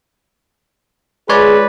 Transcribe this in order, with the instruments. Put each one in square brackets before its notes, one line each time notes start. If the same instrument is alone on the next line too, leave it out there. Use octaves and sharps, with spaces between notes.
[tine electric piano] G#3 C#5 D5 [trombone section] F4 G#4 [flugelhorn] B4